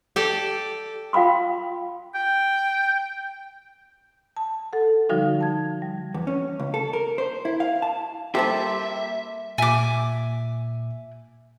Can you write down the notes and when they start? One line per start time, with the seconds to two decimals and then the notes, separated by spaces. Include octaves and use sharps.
0.16 G4 A4 D5
1.13 F4 F5 G5 B5 C6
2.14 G5
4.37 A5
4.73 A4 F#5
5.09 D3 F3 G3 D#4 F#4
5.41 A5 G#6
5.82 G3
6.14 E2
6.27 C#4
6.60 C#2
6.74 A4
6.93 A#4
7.18 C5
7.45 E4
7.60 F5
7.82 A5
8.35 C3 G3 A#3 C4 G4 A4 E5 A5
9.58 A#2 E5 G#5 D6 B6